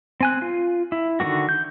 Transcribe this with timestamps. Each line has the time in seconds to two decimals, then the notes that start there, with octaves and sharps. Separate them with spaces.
0.21 C4 G#5 F#6
0.42 F4
0.92 E4
1.20 D3 D#3 A3 A#3 F#4
1.49 G6